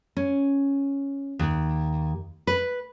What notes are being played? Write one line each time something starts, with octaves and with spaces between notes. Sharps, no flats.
C#4
D#2
B4